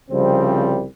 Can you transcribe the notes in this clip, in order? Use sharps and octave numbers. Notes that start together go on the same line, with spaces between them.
C2 C#3 F3 G3 C4